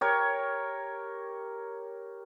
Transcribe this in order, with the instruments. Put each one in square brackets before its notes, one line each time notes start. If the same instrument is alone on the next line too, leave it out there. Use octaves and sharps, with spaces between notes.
[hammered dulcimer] G4 A#4 C#5